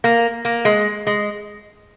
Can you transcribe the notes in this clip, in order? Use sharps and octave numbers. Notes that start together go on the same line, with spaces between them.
A#3
A#3
G#3
G#3